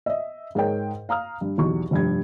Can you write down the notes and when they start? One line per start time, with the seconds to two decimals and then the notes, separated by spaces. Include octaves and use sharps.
0.06 D#5 E5
0.55 G#2 G#4 A#4 C#5 D#5 G5
1.09 F5 A#5 D#6 F6
1.41 G2
1.58 B1 E2 G4 C#6
1.91 F1 G2 G#6